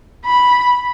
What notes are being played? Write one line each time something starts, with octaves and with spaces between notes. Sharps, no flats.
B5